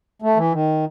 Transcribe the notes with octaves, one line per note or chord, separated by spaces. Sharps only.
A3
E3
D#3